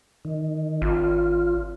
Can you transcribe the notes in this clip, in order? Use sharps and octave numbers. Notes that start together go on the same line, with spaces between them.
D#3
G#1 F4